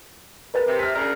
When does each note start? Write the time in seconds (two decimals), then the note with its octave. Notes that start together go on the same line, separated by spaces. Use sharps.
0.54 A#4 B4 A6
0.66 C3
0.79 F6 B6
0.95 D2 C#3 A#4 D5